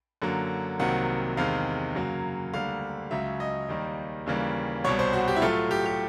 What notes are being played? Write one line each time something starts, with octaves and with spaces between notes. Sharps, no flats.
F#2 D3 F#3 A#3
C2 C3 D#3 F#3 A#3 F#5
E2 C3 D#3 G#3 F5
F#2 C#3 F#3 A#3
D2 D3 G3 A#3 F5
C#2 C#3 F#3 E5
D#5
D#2 D#3 G3 A#3
D#2 C#3 E3 G3 A#3
C2 B2 G3 C#5
C5
F#4
G4
E4
A2 F#3 A3 F4
G4
G4